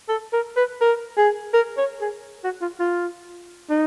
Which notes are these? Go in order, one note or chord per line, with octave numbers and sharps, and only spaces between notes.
A4
A#4
B4
A#4
G#4
A#4
C#5
G#4
F#4
F4
F4
D#4